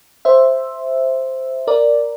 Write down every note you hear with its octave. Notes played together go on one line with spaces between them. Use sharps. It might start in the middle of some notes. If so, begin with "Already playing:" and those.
C5 E5
A#4 D5